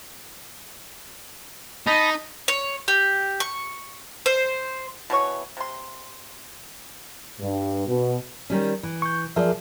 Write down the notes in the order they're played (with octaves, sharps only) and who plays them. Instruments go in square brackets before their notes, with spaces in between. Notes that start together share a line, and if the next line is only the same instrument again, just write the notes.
[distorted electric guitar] D#4 [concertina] D#5 A5 B5
[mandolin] C#5
G4
C#6
C5
[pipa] B2 E3 C#5 C#6
C3 C6
[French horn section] G2
B2
[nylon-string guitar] D#3 G3 C#4
E3
[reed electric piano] C#6 G6
[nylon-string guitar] F3 D5 [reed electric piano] G#4 A#4 E5